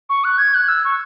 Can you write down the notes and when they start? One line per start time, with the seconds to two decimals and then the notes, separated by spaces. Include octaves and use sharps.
0.09 C#6
0.24 F#6
0.38 G#6
0.54 F#6
0.68 E6
0.85 C#6